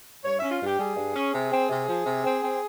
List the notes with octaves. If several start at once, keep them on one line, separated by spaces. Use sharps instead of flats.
G2 C#5
C#4 E5
F4
G2 G4
G3 G#4
G2
C#4
C3
C4
C3
F3
C3
C4
C4